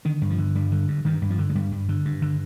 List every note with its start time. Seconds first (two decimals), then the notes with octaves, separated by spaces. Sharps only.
0.05 D3 D#3
0.22 G2
0.30 F3
0.38 D3
0.55 G2 G3
0.72 D3
0.88 G2
1.05 G2 D#3
1.22 G2
1.30 F3
1.39 D3
1.50 G#3
1.55 G2 G3
1.72 G2
1.89 D3
2.05 G2
2.22 D3